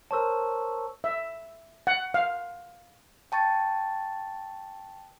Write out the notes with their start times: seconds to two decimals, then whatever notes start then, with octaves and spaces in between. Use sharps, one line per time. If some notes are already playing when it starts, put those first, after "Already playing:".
0.11 A#4 C5 C#5 A5 C#6 E6
1.04 E5
1.87 F#5
2.14 F5
3.32 G5 A5 C#6 A6